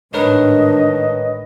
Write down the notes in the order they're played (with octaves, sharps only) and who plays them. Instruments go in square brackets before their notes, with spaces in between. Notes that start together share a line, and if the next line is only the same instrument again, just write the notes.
[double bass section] A1 G#2 D#3 [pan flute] D4 [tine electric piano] A#4 B4 C#5 [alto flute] D#5